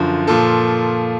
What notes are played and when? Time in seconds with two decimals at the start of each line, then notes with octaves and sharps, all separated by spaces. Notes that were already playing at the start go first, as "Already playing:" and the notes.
Already playing: F#2 D3 F3
0.27 A#2 F3 A4